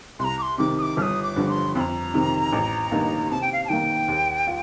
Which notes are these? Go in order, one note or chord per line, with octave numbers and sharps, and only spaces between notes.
C2 A#5 C6
D6
C6
C3 D#3 D6
D#6
D6
G1 F6
D#6
D6
G2 D3 F3
C6
F2 A#5 C6
C3 D#3
A1
G2 D#3 A#3 D#4
C3 A5
G5
F5
A5
D#3 A#3 G5
D#2
F4